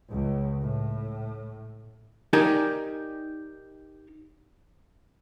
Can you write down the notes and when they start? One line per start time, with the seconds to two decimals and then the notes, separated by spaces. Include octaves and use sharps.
0.10 C#2
0.61 A2
2.33 D#4 G4 A#4 D5 G#5